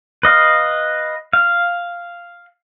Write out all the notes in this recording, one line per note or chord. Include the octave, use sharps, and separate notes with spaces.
B4 D#5 F5
F5